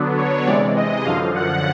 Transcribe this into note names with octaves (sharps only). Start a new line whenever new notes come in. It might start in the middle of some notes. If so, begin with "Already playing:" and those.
Already playing: D3 F#3 B3 D4
C#5
C3 E3 G#3 D5
D#5
F#2 D3 F3 F5
F#5